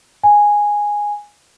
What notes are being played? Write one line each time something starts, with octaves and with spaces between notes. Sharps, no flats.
G#5